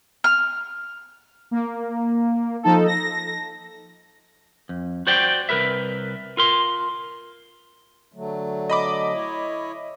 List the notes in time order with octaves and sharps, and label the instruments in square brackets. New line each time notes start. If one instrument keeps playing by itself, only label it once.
[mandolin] F6
[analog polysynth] A#3
F3 D#4 A4
A#6
[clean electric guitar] F2
F#4 C5 D5 G5
C2 A#4 B4 E5
F4 A#4 C6
[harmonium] D3 F#3 A3
[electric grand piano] D#5 B5 D6
[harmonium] E4 C#5